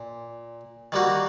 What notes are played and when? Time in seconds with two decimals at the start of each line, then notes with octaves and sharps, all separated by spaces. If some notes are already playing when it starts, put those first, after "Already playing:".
Already playing: A#2
0.92 D#3 G3 A#3 F#4